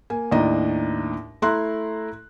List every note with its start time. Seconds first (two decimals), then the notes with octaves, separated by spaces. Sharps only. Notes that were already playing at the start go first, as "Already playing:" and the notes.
0.10 A#3 G#5
0.31 D#2 A2 D4 D#5 A#5
1.42 A3 E4 A#5 C6 F#6